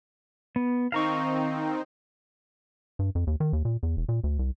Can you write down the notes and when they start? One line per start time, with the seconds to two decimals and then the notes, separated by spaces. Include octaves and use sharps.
0.56 B3
0.92 D#3 C4 D#4 F5 A#5 C#6
2.99 G2
3.15 F2
3.27 D#2
3.40 D#3
3.53 D#2
3.65 A#2
3.83 E2
3.97 E1
4.09 A#2
4.24 D2
4.39 C2